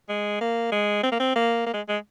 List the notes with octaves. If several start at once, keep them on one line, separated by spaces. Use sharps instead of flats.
G#3
A#3
G#3
C4
A#3
C4
A#3
A#3
G#3
G#3